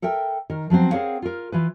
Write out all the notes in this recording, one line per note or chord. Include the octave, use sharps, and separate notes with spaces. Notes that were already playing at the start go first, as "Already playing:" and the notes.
A4 A#4 E5 G5
D#3 A#4
F3 F#3 B3 C4
C4 G#4 A#4 C#5 F5 F#5
F4 A#4
E3 F4 B4